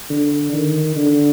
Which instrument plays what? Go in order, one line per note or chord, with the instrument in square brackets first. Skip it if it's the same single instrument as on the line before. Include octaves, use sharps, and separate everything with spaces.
[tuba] D3
D#3
D3